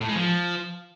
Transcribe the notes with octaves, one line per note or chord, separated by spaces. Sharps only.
A2
G#3
F3